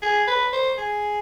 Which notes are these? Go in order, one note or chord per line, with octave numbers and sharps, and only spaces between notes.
G#4
B4
C5
G#4